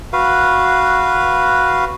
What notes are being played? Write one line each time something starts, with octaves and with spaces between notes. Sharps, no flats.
F#4 B4 F5